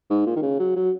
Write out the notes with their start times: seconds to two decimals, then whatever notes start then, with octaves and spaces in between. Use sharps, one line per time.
0.10 G#2
0.27 A#2
0.36 D#3
0.43 C#3
0.59 F#3
0.76 F#3